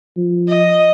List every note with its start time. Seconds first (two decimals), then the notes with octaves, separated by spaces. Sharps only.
0.16 F3
0.48 D#5